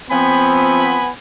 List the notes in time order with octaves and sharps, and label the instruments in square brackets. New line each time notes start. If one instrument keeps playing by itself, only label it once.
[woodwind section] F3 C4 [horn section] B3 G#5 B5